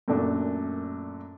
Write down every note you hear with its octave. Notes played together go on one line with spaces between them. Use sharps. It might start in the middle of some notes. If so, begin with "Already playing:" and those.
F#2 A#2 A3 D4